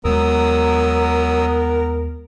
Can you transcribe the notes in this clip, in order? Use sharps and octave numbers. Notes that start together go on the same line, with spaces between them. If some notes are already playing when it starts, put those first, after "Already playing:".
D#2 F#3 G#3 B3 A#4 D#6 E6